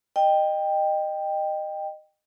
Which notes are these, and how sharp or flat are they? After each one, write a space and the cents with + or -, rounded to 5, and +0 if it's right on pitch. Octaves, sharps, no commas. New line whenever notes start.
D#5 -20 G5 +10